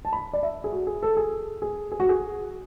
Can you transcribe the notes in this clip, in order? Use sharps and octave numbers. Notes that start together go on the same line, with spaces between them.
A5
B5
D5
E5
G#4
F#4
G#4
A4
G#4
G#4
G#4
F#4
G#4